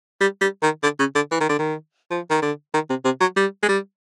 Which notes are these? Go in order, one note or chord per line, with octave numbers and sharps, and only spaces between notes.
G3
G3
D#3
D3
C#3
D3
E3
D#3
D3
D#3
F3
D#3
D3
D#3
C3
C3
F#3
G3
G#3
G3